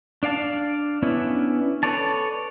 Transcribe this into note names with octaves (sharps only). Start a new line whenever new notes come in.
D4 D5 F5 A5
B3 C#4 D4 E4
A4 B4 C#5 D5 A5